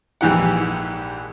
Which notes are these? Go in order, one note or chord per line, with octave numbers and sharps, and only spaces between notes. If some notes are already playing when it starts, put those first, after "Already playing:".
A#1 G#2 E3 G4 F#5